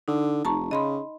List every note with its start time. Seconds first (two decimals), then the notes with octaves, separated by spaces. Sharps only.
0.08 D3 D#4
0.45 F1 A5 A#5 C#6
0.71 C#3 D#5 B5 C6